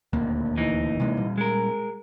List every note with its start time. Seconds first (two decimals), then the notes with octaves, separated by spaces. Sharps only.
0.13 D#1 D2 A#3
0.57 E3 D#4
1.00 C3 G#3 A#3
1.17 A#2 G3
1.38 G#3 A#4